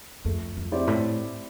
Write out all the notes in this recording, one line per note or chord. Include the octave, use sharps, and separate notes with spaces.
F2 A3
F2
C4 E4 G4 D5
A2